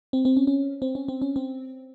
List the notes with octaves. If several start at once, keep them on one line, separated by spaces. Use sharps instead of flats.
C4
C4
C#4
C#4
C4
C#4
C4
C#4
C4